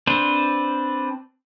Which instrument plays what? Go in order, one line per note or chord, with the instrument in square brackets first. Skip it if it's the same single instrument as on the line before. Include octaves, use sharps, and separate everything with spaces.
[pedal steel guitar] C4 D4 B4 C5